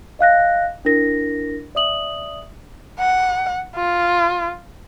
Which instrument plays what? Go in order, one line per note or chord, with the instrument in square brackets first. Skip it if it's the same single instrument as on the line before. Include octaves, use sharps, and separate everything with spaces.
[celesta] D#5 F5 F#6 A#6
D4 E4 A#4 A#6
D5 E5 D#6 F#7
[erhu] F#5
F4